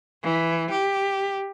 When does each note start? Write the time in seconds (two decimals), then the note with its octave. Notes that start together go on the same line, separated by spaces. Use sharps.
0.23 E3
0.71 G4